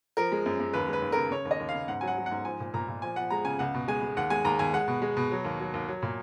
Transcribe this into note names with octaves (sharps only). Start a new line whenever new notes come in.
F3 A#4
G#3
F#2
F#2
D#2 B4
G#3
B4
D#2
C#3 A#4
C#3 C#5
D#2
D#5
D#2
F5
C#3
G#2 F#5
F#3 G#5
F#5
F#3
G#2 F#5
F3 G#5
A#2
A#2 A#5
A#2
F3 G#5
F3 F#5
G#3 A#5
C#3 G#5
C#2 F#5
B2
G#3 G#5
G#3
D#2 F#5
G#3 G#5
D#2 A#5
D#2 G#5
G#3 F#5
B2
G#3
B2
F#3
D#2
F#3
D#2
F#3
A#2